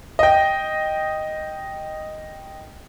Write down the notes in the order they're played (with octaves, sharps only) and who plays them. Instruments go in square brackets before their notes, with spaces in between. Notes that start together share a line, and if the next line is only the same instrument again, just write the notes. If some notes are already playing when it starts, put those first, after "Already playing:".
[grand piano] D#5 G5